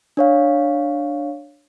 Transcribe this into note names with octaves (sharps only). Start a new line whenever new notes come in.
D4 C#5 F5